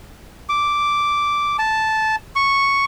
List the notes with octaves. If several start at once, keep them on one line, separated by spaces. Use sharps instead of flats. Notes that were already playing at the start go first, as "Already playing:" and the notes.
D6
A5
C#6